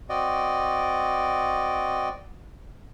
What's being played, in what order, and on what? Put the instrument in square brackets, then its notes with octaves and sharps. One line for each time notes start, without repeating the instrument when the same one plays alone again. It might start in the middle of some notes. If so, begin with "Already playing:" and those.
[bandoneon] C4 F#4 D5 D#5